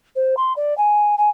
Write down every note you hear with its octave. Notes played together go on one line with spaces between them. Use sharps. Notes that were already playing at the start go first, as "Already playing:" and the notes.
C5
C6
D5
G#5
G#5